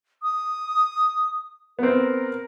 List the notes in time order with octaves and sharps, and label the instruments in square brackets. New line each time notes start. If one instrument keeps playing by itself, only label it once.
[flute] D#6
[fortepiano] B3 C4 [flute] A#4